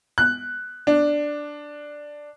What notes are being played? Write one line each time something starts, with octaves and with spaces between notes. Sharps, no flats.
F#6
D4